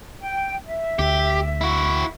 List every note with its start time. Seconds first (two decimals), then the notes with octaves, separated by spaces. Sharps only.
0.20 G5
0.67 E5
0.99 D2 G4
1.61 E4 F#4